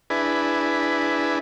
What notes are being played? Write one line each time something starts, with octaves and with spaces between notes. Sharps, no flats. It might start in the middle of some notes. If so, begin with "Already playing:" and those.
D4 E4 G#4 B4